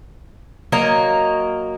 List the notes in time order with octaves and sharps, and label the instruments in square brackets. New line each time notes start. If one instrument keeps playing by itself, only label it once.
[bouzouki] F#3 A#3 D#5 A#5